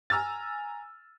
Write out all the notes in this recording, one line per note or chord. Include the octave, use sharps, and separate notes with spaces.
G#5 A#5 E6 F6 A6